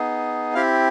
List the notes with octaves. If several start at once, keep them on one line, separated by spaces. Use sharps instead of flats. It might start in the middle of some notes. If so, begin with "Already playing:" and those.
Already playing: B3 D#4 G#4
C4 E4 G4 F5